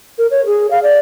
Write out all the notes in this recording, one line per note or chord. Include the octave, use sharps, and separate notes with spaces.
A#4
C#5
G#4
F5
D5